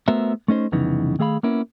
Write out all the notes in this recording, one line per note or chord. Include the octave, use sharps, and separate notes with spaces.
A3 B3 F#4 A#4 C5 E5
A3 C#4 D#4 C5
C2 F2 C#3 E3 B3 D#4
D#3 A3 G#4 F5 B5
A#3 B3 C#4 E4 A#4